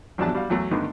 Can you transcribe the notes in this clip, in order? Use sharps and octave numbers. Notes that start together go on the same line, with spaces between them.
A1 F2 F#3 D4 G4 A5
G3 F#4 F5
E2 F#3 A3
G2 D3 D#3 A3 B3 D#4